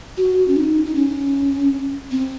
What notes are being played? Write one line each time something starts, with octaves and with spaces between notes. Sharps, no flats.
F#4
C#4
D#4
D#4
C#4
C4